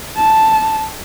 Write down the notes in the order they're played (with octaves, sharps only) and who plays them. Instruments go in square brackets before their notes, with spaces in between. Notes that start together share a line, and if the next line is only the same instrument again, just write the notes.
[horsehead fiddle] A5